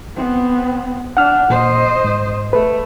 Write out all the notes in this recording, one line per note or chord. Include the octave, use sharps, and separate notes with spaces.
B3 C4
D4 F#5 F6
A#2 C5 D#5
G#2
A3 B4